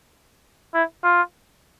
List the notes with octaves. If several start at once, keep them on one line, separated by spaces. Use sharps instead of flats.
E4
F4